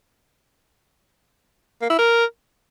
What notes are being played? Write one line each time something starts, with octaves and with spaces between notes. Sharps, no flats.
A#3
E4
A#4